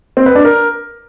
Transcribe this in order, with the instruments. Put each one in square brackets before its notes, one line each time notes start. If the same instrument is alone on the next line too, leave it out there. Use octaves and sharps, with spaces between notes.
[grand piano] C4
B4
D4
A#4